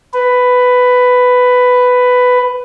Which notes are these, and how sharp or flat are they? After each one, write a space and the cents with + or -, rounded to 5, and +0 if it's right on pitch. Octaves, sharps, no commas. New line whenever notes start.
B4 +10